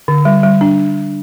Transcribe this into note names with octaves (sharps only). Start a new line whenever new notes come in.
D3
G3
G3
D4